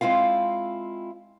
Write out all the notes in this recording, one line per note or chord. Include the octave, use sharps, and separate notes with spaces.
G#3 C4 E4 F4 F5